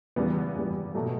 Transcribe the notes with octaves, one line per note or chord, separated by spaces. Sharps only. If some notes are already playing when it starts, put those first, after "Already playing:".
E2 C#3 G3 B3
E2 C#3 G3 B3
B2 F#3 A3